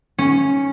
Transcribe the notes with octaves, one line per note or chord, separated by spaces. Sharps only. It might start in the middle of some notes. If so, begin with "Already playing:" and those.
C#4